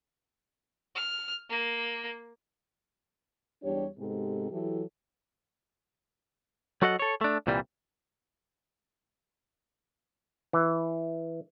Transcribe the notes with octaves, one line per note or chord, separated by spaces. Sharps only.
F6
A#3
E2 G3 D4 G4 C#5
G#2 C3 G#3 B3 G4 A4
E3 F#3 E4 G4 A4
F#3 F#4 A4 D#5 F#5
A4 C#5
A3 D4
C2 A#2 E3 G3
E3